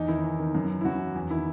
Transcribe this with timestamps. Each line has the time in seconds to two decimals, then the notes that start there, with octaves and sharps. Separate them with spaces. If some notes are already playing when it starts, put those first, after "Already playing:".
Already playing: E2 D#4
0.08 D#3 E4
0.24 E2
0.39 D#3
0.55 F#2
0.69 E3
0.81 E4
0.85 F#2 F#4
1.00 E3
1.15 E2
1.31 D#3 E4